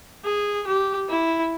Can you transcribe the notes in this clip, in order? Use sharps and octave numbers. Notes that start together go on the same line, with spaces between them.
G#4
G4
E4